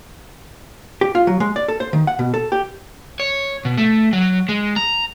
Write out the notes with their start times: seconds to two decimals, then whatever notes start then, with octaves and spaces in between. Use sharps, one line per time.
1.01 G4
1.15 F4
1.27 F#3
1.40 G#3
1.56 D5
1.68 A4
1.80 C5
1.93 D#3
2.07 F#5
2.19 B2
2.34 A4
2.52 G4
3.20 C#5
3.65 B2
3.78 A3
4.13 F#3
4.49 G#3
4.76 A#5